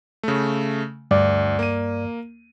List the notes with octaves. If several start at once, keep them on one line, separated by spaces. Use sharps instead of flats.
C#3 A3
D2 G2 D5
A#3 D#7